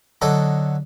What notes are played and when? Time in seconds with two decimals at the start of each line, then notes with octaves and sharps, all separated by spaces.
0.22 D3 F#3 A4 D#5